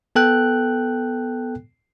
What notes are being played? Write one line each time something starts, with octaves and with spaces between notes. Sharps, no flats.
B3 A4 G5 F#6